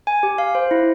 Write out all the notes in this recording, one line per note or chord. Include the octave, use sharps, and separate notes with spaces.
G#5
G4
F5
C5
E4